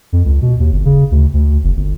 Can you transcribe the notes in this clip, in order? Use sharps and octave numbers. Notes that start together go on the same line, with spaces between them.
F2
C#2
B2
D#2
G1
C#3
D2
D2
F#1
G1